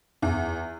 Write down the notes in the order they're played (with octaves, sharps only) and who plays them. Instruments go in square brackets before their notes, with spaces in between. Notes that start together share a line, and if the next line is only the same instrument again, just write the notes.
[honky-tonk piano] E2